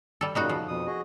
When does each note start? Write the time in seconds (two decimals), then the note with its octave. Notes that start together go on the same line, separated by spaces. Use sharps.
0.21 G3 A4
0.35 F#2 A#2 C#3 G3 D#4 F#4
0.49 F3
0.68 F2 B2 D#6
0.87 F#4 G#4 D#5